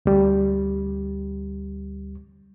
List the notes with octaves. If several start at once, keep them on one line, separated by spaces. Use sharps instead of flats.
D2 G3